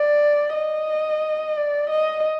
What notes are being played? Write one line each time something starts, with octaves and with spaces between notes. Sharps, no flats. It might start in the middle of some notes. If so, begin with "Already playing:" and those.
Already playing: D5
D#5
D5
D#5